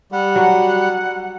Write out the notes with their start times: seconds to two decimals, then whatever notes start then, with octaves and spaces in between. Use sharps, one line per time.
0.12 G3 F#5
0.36 F#3